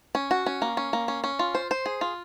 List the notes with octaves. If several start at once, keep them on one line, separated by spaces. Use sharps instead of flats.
C#4
F#4
C#4
A#3
C#4
A#3
C#4
C#4
F4
C5
C5
G#4
F4